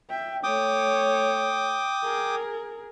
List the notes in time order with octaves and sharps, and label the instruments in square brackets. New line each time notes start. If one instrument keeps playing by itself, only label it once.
[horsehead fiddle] E5 G5
[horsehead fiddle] A3 C#5 [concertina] G5 D6 D#6
[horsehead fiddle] G#4 A#4